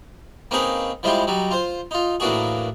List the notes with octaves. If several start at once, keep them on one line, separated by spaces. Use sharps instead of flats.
A#3 C4 C#4 D#4 G#4 B4
F3 G3 G#3 E4 F4 G4
F#3 G3 D#4
F4 C5
D#4 F4
A2 E3 A#3 D4 F#4 G#4